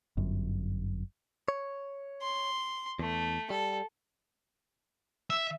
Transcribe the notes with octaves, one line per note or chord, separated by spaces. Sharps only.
G1 F#2
C#5
C6
E2 A3
G3 A4
E5